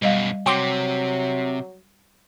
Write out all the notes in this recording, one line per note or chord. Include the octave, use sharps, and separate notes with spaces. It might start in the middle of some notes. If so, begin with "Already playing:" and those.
F#2 B2 G3 D#5 F5
C3 F#3 G5 C6 D6